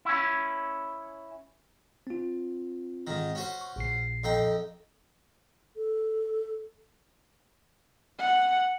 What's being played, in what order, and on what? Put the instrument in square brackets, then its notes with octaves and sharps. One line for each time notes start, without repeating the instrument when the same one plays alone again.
[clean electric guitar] C#4 E4
[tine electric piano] C4 F4
[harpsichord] G#2 D#3
C#4 F#4 C5
[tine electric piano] C#6
A#1 A#2 C7
[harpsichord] F2 D#4 G5
[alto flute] A4
[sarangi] F#5